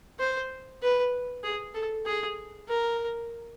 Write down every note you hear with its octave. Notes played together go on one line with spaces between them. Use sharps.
C5
B4
G#4
A4
G#4
A#4